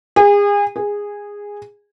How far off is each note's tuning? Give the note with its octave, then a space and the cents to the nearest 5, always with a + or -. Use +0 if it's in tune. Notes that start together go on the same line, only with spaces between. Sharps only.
G#4 -35
G#4 -15